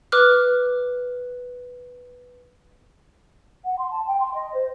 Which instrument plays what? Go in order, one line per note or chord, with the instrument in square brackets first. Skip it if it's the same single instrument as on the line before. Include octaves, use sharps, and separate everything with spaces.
[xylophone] B4 D6 F6 F#6
[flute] F#5
C6
A5
G5
C6
D#5
C5